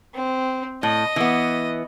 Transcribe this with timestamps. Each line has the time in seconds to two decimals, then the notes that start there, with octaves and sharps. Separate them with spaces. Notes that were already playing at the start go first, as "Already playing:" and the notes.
0.14 C4
0.83 A2 D#5
1.16 E3 B3